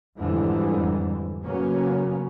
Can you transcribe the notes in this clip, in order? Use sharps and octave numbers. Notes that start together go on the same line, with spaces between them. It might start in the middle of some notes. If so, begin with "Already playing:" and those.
F2 G#2 D3 E3 G3
C#3 F#3 A#3 B3 C#4